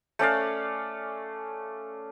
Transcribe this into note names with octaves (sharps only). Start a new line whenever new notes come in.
A3 C#4 D5 F5